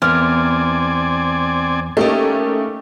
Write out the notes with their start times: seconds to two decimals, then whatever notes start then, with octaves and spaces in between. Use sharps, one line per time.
0.02 E2 C4 A#4 D5 G#5 F6
1.97 A3 A#3 C#4 D#4 G4